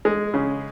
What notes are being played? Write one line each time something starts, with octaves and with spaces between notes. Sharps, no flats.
G#3
C#3